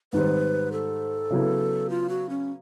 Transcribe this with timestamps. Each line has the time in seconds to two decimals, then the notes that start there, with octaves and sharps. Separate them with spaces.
0.13 G#2 D#3 G3 C4 B4
0.72 A4
1.30 C#3 F#3 B3 E4
1.90 F4
2.09 F#4
2.30 C#4